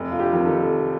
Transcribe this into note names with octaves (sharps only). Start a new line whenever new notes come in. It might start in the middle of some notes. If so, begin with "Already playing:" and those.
Already playing: F1
F4
G4
F2 D#3
A4